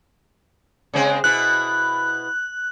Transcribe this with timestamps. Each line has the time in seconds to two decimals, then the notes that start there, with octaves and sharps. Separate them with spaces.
0.94 C#3 G#3 C4
1.24 B2 E4 F#6